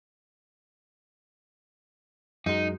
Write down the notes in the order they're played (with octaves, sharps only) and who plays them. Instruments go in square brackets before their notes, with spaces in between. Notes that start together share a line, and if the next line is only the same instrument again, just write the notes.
[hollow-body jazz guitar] F#2 G#3 [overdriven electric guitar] D#4